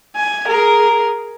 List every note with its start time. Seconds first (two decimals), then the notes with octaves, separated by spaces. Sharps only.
0.16 G#5
0.48 G#4 A#4